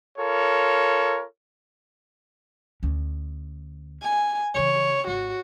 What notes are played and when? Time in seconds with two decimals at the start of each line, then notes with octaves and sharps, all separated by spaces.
0.18 F4 A4 A#4 C#5
2.83 D2 C#4
4.02 G#5
4.55 C#3 E3 C#5
5.07 G#1 F#4